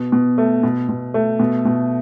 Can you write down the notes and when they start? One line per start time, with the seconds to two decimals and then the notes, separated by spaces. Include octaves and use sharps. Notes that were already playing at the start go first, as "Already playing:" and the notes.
Already playing: B2
0.12 B2
0.38 A3
0.63 B2
0.89 B2
1.14 A3
1.39 B2
1.65 B2